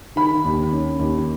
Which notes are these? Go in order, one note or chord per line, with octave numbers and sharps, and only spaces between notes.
D#3 B5
D#2
C#4
D#2